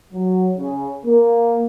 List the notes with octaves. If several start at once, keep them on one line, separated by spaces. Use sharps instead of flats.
F#3
C#3
A#3